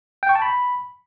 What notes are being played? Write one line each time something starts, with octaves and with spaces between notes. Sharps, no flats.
G5
C#6
A5
B5